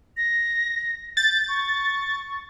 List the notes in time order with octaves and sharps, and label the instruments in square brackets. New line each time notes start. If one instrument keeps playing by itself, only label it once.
[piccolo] A#6
[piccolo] G6 [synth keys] A6
[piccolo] C#6